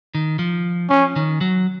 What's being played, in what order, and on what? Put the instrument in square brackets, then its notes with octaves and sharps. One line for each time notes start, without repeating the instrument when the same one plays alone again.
[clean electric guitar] D#3
F3
[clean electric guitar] F3 [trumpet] C#4
[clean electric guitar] D#3
F#3